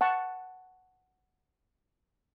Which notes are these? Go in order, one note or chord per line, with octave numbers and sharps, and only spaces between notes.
F#5 A5 C#6